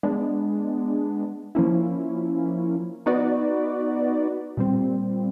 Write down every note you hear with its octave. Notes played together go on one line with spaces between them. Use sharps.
G#3 B3 D4
F3 A#3 C#4 E4
B3 D#4 F#4 B4 D5
A#2 G3 C4